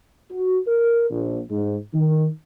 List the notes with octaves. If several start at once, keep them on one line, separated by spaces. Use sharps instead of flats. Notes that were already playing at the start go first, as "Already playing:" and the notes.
F#4
A#4
A#1
G#2
D#3